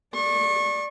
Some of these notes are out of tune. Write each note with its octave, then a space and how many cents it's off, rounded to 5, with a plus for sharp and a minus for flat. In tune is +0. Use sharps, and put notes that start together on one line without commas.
D5 +0 C#6 -30